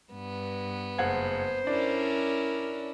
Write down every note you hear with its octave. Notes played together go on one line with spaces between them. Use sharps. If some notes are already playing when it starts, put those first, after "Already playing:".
G2 B3
F#1 C5 F#5 G#6
C#4 D4 E4 A#4